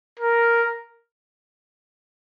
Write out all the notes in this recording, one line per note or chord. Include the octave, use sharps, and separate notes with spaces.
A#4